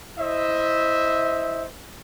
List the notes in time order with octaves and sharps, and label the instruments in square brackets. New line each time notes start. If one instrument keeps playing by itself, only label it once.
[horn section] E4 C5 D#5 E5